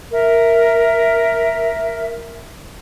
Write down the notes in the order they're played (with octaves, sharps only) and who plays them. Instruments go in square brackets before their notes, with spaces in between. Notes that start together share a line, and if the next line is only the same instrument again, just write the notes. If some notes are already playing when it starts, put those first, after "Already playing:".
[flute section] A#4 E5